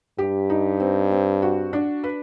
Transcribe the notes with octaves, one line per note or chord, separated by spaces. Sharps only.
G2 G4
D#4
C4
C4
F#4
D4
B4